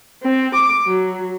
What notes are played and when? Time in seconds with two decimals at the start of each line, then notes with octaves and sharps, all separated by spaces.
0.22 C4
0.54 D6
0.86 F#3